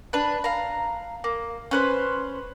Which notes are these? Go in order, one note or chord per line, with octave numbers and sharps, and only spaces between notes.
D4 B4
F5 A#5
A#3
C#4 B4 C5